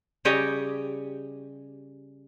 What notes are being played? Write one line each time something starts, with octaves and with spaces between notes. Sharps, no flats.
C#3 G3 G4 C#5 D#5